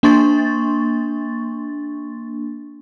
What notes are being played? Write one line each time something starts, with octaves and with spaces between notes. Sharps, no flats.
A#3 D4 C6 C#6 A6